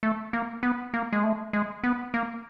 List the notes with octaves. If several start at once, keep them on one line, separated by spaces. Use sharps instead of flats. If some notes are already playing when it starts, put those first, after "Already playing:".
A3
A#3
B3
A#3
G#3
A3
G#3
B3
A#3